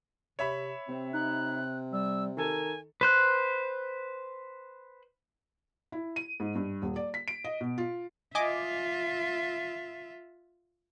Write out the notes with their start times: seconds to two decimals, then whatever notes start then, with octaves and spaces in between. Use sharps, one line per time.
0.39 C3 C#5 E5 B5
0.88 C3 C4
1.13 D#4 F#6
1.93 G3 E6
2.37 D#3 A4 A#4 G#5
3.01 B4 C5 F#6
5.92 E4
6.16 D#7
6.40 G#2
6.55 G2
6.82 D#1
6.96 D5
7.14 B6
7.28 D7
7.44 D#5
7.61 B2
7.78 F4
8.35 F4 D#5 E5 G#5 D6